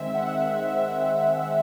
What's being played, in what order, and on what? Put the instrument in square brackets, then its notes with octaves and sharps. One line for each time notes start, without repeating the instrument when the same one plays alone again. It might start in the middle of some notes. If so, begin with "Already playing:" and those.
Already playing: [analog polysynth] D#3 G#3 C4 E5
F#5